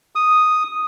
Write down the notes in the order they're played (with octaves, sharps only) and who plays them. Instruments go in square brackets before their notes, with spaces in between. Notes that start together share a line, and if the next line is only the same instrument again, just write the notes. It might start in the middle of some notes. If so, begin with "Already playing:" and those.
[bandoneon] D#6